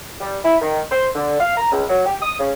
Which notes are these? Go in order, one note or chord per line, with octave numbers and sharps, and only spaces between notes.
G3
E4
D#3
C5
D3
F5
A#5
C#2
F#3
G4
D#6
C#3